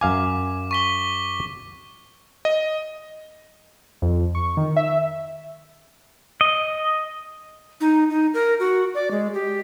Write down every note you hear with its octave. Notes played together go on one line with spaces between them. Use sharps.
F#2 F5 G#5 D6
C#6 B6 G7
D#5
F2
C#6
D#3
E5
D#5
D#4
D#4
A#4
F#4
D5
G#3
G4